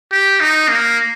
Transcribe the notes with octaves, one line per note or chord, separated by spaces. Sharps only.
G4
D#4
A#3